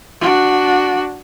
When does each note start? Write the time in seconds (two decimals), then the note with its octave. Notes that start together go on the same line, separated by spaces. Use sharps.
0.21 D4 F#4